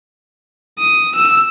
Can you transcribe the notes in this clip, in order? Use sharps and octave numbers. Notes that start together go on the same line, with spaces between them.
D#6
E6